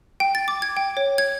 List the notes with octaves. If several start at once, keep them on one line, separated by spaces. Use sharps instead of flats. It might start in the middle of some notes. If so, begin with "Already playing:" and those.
G5
A6
D6
G#6
G5
C#5
G#6